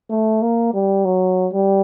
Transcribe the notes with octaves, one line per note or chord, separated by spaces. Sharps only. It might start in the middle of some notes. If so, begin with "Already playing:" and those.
A3
A#3
G3
F#3
G3